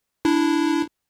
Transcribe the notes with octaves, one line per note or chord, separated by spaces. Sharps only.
D4 E4